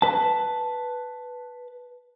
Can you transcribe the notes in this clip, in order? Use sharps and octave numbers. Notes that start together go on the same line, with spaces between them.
B4 A5